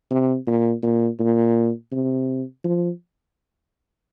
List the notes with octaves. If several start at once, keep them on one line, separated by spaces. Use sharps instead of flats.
C3
A#2
A#2
A#2
C3
F3